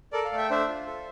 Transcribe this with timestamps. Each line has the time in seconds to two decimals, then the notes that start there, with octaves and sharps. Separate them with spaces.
0.12 A4 A#4 D5
0.25 D5 F5
0.32 A3
0.37 E5 G5
0.50 D4 C5 E5
0.68 F4
0.87 A4